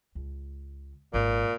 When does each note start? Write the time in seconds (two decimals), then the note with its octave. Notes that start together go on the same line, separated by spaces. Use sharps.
0.15 C#2
1.14 G#1 A#2